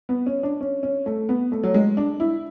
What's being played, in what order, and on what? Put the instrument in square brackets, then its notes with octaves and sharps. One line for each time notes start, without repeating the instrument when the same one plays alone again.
[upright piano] B3
C#4
D4
C#4
C#4
A3
B3
A3
F#3
G#3
D4
E4